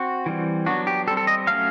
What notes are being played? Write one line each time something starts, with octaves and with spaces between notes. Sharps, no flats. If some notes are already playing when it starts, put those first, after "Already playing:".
Already playing: C4 F#4
E3 G3 C4
F#3 B3 D4 F#4
G4
G3 C4 A4
A4
D#5
F#3 A3 C#4 F5